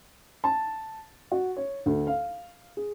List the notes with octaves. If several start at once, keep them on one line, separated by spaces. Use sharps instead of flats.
A5
F#4
C#5
D2
F5
G#4